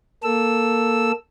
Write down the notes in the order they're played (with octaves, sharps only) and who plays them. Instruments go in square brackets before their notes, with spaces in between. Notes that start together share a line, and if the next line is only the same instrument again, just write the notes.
[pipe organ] A#3 A4 E6